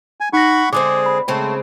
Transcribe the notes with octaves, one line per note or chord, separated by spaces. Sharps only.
G#5
D#4 F#5 B5 C#6 A#6
D3 G#3 C4 G#4 D6
B5
C#3 G#3 A3 C4